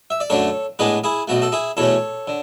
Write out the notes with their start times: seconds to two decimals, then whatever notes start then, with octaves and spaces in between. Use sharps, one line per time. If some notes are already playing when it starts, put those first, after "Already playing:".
0.10 E5
0.20 D5
0.30 F#2 D3 A3 D4 A4 C#5
0.79 A2 G#3 B3 D4 G#4 B4
1.04 E4 G#4
1.28 B1 B2 A3 F#4
1.42 A4
1.52 E4 G#4
1.77 E2 B2 A3 C#4 A4 C#5
2.27 D3